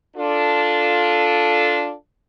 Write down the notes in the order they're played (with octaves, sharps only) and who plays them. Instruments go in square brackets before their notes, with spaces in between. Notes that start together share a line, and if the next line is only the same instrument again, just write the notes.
[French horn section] D4 F4 A4